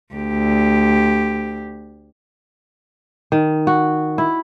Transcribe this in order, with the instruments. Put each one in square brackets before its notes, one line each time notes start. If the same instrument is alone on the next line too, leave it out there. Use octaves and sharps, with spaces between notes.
[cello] D2 G4
[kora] D#3
F#4
E4